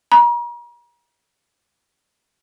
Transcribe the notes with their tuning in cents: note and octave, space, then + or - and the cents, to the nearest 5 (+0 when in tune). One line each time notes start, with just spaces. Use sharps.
A#5 +40